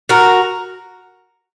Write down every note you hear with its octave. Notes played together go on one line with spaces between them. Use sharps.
F#4 A#4